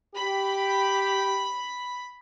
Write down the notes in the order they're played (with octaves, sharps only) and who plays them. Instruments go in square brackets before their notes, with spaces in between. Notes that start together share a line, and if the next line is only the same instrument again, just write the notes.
[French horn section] G4 [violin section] B5